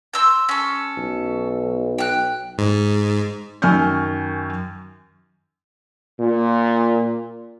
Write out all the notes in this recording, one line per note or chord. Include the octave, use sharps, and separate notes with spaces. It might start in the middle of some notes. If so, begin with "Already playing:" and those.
C6 E6 G6
C#4 A4
B1
G5 F#6
G#2
F#2 D#3 G#5 C#6 F6 G6
A#2